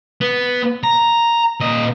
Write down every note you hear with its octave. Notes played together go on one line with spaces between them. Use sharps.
B3
A#5
A#2 D#5